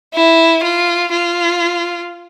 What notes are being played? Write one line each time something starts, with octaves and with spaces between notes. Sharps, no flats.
E4
F4
F4